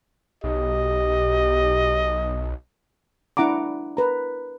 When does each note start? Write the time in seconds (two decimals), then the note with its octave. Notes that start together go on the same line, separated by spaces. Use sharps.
0.44 B1 G4 D#5
3.37 D4 E4 F#5 A#5 D6
3.97 A#4 B4 A#5